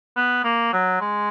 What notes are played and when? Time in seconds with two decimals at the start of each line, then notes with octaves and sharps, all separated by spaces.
0.16 B3
0.44 A#3
0.73 F#3
1.01 G#3